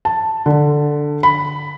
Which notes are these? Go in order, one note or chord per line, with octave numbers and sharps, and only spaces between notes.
A5
D3
B5